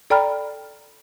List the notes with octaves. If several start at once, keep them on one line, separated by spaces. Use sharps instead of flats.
A4 D5 G5 A#5 B5 F6